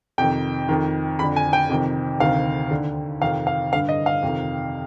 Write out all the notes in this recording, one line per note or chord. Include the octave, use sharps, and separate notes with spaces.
F2 C3 D#3 G5
F2 D#3
F2 D3 B5
G#5
G5
F2 C3 D#3
D2 C3 D#3 F5
D#2 D3
F2 C3 D#3 F5
F5
G2 D3 F5
D#5
F5
F2 C3 D#3